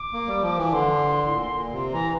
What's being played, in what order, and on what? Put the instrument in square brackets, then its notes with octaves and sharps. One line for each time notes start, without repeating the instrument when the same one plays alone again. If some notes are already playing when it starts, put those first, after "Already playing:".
Already playing: [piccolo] D6
[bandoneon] A#3
G3
F3
E3
[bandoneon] D3 [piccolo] C6
[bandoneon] A2
A#2
A#2
C3
[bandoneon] E3 [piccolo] A#5